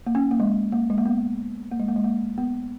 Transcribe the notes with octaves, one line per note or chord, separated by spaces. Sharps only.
A#3
C#4
A#3
G#3
A#3
G#3
A#3
B3
A#3
G#3
A#3
G#3
A#3
B3